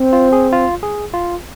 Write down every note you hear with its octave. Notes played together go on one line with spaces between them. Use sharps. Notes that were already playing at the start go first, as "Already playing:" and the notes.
Already playing: C4
F4
G#4
F4
G#4
F4